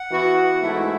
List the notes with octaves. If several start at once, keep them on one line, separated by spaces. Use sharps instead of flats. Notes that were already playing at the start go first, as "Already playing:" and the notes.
Already playing: F#5
E3 B3 F#4
G#2 E3 A3 E4 E5